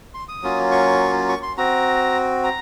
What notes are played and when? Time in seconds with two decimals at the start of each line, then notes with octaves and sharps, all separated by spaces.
0.14 C6
0.28 D#6
0.42 F#3 A#3 C#4 F4
0.72 C#6
1.29 C#6
1.43 C6
1.57 C4 F#4 A#5
2.44 A#5